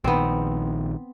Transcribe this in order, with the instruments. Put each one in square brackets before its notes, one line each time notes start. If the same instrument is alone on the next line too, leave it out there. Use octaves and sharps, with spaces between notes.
[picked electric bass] A#1 D#3 [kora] B3 C4